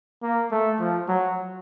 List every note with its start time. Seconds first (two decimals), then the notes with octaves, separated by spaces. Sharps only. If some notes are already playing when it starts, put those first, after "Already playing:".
0.22 A#3
0.51 A3
0.79 F3
1.09 F#3